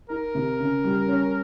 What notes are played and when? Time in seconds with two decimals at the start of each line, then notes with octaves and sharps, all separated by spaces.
0.09 D#4 A#4
0.35 C3
0.60 C#3
0.84 G3
1.08 C#4